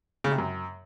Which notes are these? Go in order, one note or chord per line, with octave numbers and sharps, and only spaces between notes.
C#3
C3
F#2